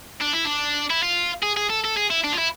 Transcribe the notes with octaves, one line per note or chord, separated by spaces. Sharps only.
D4
E4
D4
E4
F4
G#4
G#4
A4
A4
G#4
E4
D4
F4
E4